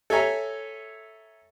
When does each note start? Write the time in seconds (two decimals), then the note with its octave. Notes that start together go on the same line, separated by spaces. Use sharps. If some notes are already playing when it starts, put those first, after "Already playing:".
0.10 A4 C#5 E5 G#5 A#5